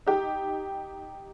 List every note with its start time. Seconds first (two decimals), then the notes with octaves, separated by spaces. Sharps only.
0.07 D#4 G4